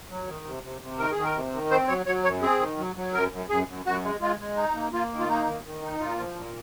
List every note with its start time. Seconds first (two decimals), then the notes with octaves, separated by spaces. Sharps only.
0.10 F#3
0.27 D#3
0.45 C3
0.63 C3
0.81 C3
0.98 D#3 A#4
1.12 D#3 G#4
1.23 A#4
1.35 C3
1.53 D#3
1.71 C4 C5
1.88 F#3 C#5
2.06 F#3 C#5
2.24 F#2 C#5
2.42 C4 G#4
2.60 D#3
2.78 F#3
2.96 F#3
3.13 F#2 A#4
3.32 F#2
3.49 F#2 G#4
3.67 F#2
3.85 F#2 F#4
4.03 G#3
4.21 G#3 F4
4.39 G#3
4.56 D#4
4.75 A#3
4.93 A#3 F4
5.11 D#3
5.19 F4
5.28 A#3 D#4
5.46 D#3
5.64 D#3
5.82 D#4
6.00 A#2 F4
6.18 F3
6.36 A#2